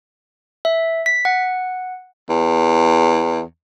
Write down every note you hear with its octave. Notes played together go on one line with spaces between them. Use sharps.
E5
B6
F#5
E2